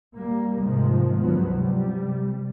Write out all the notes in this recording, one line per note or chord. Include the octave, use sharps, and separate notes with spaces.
G3 A#3
G#2 C3 D#3 F3 G#3
C#2 G2 D#3 F3 F#3 B3
C3 G3